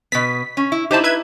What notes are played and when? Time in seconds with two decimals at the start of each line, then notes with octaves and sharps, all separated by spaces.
0.12 B2 B3 B6
0.57 C#4
0.72 E4
0.91 D#4 E4 G4 C5 A5
1.04 B4 E5 G#6